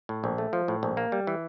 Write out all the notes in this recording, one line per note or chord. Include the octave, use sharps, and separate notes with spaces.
A2
A#1
A3
F3
A2
A#1
A#3
G3
E3